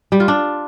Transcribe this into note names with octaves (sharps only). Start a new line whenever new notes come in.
G3
F4
D4